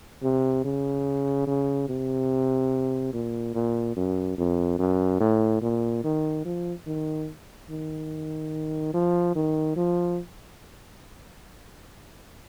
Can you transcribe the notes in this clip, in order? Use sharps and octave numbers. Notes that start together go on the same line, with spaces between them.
C3
C#3
C#3
C3
A#2
A#2
F#2
F2
F#2
A2
A#2
D#3
F3
D#3
D#3
F3
D#3
F3